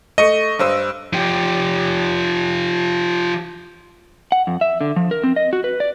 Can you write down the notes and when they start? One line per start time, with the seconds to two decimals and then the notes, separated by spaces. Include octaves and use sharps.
0.18 A3 D#5 C#6 C#7
0.59 G2 C5 E6
1.13 F3 G4
4.32 F#5
4.47 F2
4.61 E5
4.81 D3
4.96 F3
5.11 A#4
5.23 C4
5.36 D#5
5.53 F#4
5.64 B4
5.80 D5